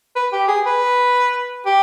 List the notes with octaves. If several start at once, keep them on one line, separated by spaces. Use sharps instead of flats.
B4
G4
G#4
B4
G4